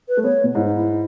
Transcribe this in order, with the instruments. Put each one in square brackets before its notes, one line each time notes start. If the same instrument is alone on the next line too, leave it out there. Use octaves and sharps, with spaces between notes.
[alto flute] B4
[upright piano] A3
[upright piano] B3 [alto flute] C#5
[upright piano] B2
[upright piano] G#2 [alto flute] E4
[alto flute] D#4
E4